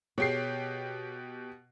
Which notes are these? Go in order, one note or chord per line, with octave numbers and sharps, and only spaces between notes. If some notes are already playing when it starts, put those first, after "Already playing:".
B2 G4 G#4 C#5 C7